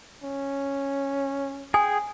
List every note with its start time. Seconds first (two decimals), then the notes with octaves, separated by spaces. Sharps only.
0.23 C#4
1.74 G#4 G5 G#5 D#6